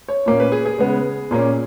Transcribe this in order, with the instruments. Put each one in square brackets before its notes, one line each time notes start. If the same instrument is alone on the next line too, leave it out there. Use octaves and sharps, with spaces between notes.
[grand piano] C#5
A#2 A#3 C#4
B4
G#4
G#4
C#3 G#3 B3
A#2 A#3 C#4